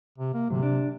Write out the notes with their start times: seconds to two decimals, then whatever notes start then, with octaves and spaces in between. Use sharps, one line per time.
0.18 C3
0.34 A#3
0.50 D2 G#2 C3 F#3
0.63 D4